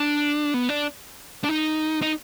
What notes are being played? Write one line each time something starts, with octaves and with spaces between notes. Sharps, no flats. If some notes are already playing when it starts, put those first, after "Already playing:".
Already playing: D4
B3
D4
D4
D#4
D#4